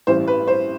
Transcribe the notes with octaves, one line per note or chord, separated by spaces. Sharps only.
A1 G2 E3 G3 C5
B4
C5